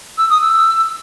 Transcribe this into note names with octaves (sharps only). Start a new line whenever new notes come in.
E6
D#6
E6